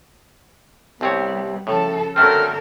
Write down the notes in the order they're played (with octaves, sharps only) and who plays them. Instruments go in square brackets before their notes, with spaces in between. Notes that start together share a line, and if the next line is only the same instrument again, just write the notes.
[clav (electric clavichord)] C2 C4 C#5 [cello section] G3 B3
[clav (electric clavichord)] A2 [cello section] C#3 F3 A4
[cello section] D3 A4 A#4 [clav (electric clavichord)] F#3 A3 C4 [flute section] F6